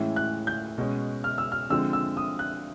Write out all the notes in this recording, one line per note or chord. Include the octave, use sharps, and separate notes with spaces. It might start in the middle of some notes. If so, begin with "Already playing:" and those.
Already playing: A2 E3 G#3 C#4
F#6
G6
B2 G#3 C#4
F6
E6
F6
D3 F3 G#3 C4 E6
E6
D#6
F#6